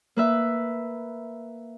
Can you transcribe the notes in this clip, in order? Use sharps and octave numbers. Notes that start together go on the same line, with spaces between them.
A#3 B4 E5